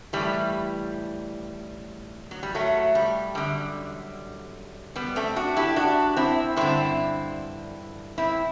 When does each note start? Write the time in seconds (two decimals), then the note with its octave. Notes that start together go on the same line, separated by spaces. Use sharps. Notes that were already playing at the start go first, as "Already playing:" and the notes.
0.13 A2 E3 G3
2.31 F#3
2.43 G3
2.55 F#3 A3
2.95 G3
3.35 F#2 D3 G3
4.96 G3 B3
5.16 A3 C4
5.36 D4 F#4
5.56 E4 G4
5.76 D4 F#4
6.17 C4 E4
6.57 G2 D3 C4 E4
8.18 C4 E4